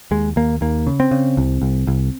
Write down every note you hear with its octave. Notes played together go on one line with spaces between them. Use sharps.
D#2 G#3
D#2 A#3
D#2 A#3
C#3
C4
C#3
C2
C2
C2